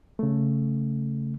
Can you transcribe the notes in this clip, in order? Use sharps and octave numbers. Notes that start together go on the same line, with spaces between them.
C#3 A3